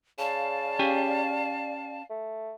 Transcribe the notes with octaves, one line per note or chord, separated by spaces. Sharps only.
C#3 D5 F5 A5
C#4 G4 G#5
A3